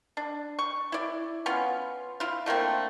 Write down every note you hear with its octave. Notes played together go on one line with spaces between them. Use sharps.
D4
C#6
E4 D5
B3 C#4 F4
E4 F4
D3 A3 A#3 C4